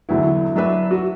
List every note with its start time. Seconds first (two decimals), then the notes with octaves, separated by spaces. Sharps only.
0.09 E2 D3 F#3 B3 E4 F#4
0.55 F#3 D4 B4 E5
0.91 F#4